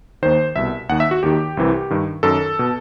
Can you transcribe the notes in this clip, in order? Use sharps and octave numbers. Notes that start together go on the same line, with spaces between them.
D#2 D#3 C5
C2 B2 E5
D#2 D#3 F#5
E5
F#4
D#2 D#3 G4
C2 C3 E3
G2 D#3
F#2 D#3 A4
B2